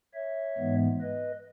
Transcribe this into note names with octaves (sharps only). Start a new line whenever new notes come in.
C#5 E5
G#2 E3 G#3 B3
B4 D#5